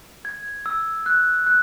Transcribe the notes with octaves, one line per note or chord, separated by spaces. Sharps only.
G#6
E6
F#6
F#6